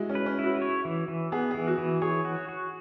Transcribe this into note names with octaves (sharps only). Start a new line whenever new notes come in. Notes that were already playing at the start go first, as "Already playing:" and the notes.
Already playing: G#3 E4 F#4
C#4
B4
C#4
E4
F#4
C#5
E3
E3
B3 G#4
E3 G#4
F#4
E3
G#4 C#5
F#4
F#4